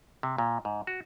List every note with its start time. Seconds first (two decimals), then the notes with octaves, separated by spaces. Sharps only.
0.23 C3
0.38 A#2
0.65 G#2
0.87 F#4